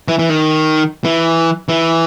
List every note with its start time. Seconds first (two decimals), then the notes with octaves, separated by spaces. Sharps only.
0.08 E3
0.19 E3
0.30 D#3
1.04 E3
1.69 E3